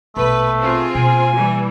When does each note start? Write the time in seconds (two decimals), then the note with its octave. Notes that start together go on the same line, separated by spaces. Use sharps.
0.17 A#1 B2 A3 B4
0.60 C4 F4 G#4
0.95 B2 A#3 G#5
1.35 E3 G3